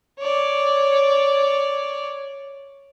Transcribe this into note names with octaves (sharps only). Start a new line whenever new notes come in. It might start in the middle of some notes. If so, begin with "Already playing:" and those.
C#5 D5